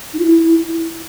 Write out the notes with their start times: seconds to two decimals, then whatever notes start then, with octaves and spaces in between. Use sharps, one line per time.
0.13 D#4
0.19 F4
0.25 E4